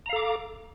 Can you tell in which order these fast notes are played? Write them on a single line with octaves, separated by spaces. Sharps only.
A#5 F5 A4 D6